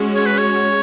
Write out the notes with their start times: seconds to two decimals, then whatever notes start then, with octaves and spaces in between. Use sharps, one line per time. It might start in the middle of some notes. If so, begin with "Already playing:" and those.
Already playing: G#3 C#4 F#4
0.15 C#5
0.26 B4
0.38 C#5